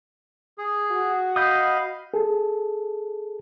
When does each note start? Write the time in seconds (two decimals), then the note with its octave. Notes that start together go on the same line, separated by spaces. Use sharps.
0.58 G#4
0.91 F#4
1.36 D#5 F5 B5 D#6 G6
2.14 G#4 A4